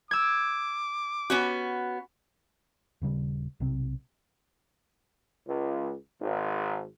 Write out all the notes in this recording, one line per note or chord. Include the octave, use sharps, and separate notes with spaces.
D6 E6 G#6
B3 C#4 F#4
D#1 C#3 G3
B1 C3 C4
C#2
G#1